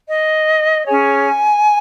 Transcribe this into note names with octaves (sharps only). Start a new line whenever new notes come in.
D#5
C#4 G#4 C#5 G#5